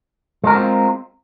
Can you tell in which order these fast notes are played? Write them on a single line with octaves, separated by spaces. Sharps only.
G#3 A#4 F#4 C4 F4